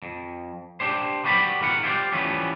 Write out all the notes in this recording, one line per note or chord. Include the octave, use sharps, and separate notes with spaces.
F2
D4 G4 C5
B3 F#4 G4 D5 A5 B5
G#2 D#3 F4 F#4 F#5
E4 F4 G4 A4 C5 D5
E3 F3 G3 A3 B3 C#4